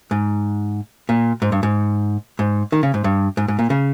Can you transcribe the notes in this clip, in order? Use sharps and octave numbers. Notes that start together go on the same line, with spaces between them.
G#2
A#2
G#2
G2
G#2
G#2
D#3
C#3
G#2
G2
G#2
G#2
A#2
C#3